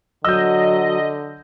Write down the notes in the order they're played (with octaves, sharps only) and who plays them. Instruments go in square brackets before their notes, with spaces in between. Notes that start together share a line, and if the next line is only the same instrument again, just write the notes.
[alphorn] D3 [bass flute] F#3 [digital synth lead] D#5 [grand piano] E6 G6